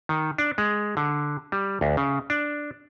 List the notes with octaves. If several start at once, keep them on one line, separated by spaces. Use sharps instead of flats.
D#3
D4
G#3
D3
G3
D2
C#3
D4